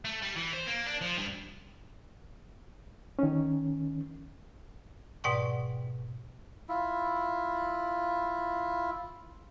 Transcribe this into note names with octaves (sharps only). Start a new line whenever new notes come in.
A3
G3
E3
C5
A#3
D4
F3
G2
D#3 C#4
G#2 B2 D5 F#5 G5 C#6
E4 F4